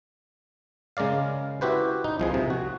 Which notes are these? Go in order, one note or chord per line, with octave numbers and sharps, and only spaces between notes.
C#3 G#3 A#4 D5 F5
E4 F#4 G4 B4 C5
D#4
C2 F3 G#4
C3
F#4